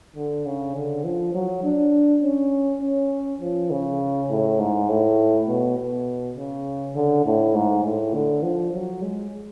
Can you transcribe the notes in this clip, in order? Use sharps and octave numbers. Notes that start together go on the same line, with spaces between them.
D3
C#3
D3
F3
F#3
D4
C#4
C#4
F3
C#3
A2
G#2
A2
B2
B2
C#3
D3
A2
G#2
A2
D3
F3
F#3
G#3